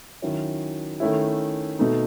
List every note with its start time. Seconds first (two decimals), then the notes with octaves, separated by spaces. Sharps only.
0.22 D#3 F#3 C#4 E4
1.00 D#3 A3 C#4 E4
1.79 B2 A3 D#4